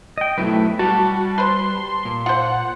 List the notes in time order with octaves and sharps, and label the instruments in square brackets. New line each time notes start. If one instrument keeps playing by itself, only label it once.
[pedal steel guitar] D#5 G5
[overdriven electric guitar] F#2 B2 [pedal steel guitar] A3 E4 B4
[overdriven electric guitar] G3 [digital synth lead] F#4 [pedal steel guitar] A5
[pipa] B4 C5 [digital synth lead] C6
[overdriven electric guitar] A#2
[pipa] F4 C5 [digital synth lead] F#5